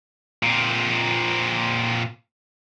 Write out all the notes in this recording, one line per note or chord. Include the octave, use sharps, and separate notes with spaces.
A#2 C4